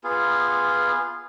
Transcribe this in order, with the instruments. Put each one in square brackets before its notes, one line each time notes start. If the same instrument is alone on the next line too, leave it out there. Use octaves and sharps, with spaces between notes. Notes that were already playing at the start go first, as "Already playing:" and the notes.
[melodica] B3 F4 G#4